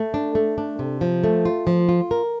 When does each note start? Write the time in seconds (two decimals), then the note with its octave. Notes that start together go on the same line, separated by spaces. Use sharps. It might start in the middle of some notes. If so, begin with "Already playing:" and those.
Already playing: A3
0.14 D4
0.35 A3
0.58 D4
0.79 C3
1.01 F3
1.24 A3
1.45 F4
1.67 F3
1.89 F4
2.11 A#4